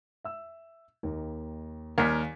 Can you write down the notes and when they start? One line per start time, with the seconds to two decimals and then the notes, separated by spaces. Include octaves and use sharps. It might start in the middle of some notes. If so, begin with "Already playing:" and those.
0.24 E5 E6
1.03 D#2 D#3 A#3
1.98 D#2 A#4 D5 G#5 B6